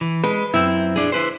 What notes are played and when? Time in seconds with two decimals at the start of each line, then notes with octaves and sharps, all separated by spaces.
0.01 E3
0.24 G#3 B4
0.54 F#2 C4 E4
0.96 D4 G#4
1.12 E4 B4 C5